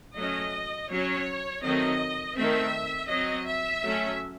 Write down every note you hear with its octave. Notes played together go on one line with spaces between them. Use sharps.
F#3 A3 C#4 D#5
F#3 C#4 C#5
D#3 F#3 A3 C4 D#5
D#3 A3 C4 E5
F#3 C4 D#5
E5
F#3 A3 C#4